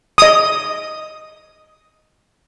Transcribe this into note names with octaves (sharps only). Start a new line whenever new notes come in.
D#5 D#6